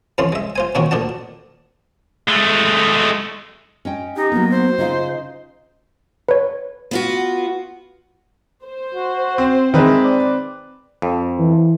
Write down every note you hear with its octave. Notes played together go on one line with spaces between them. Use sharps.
F2 E3 C#4 F4 C6
G#3 E5
F4 C5 G#5
A#2 D#3 A#3 C4 C#4 F#4
D2 A#2 D4 F#5 A5
G#3 A3
C#4 D#5 G5
D#4 G4
F#3 A#3 B3
C5
C#3 D#4 F4 D#5
B4 C#5
B3 F4 F#4
C5
F#4
C4
D#3 G#3 C4 B4 E5
D5
F2
E3